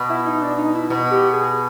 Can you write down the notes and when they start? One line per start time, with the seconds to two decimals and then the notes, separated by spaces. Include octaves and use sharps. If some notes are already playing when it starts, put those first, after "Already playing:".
Already playing: B2
0.10 E4
0.26 D#4
0.42 D4
0.58 D#4
0.74 E4
0.90 B2
1.11 G4
1.33 G#4